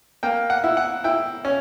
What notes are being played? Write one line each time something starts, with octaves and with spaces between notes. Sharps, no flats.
A#3 G5
F#5
E4
F#5
E4 G5
C#4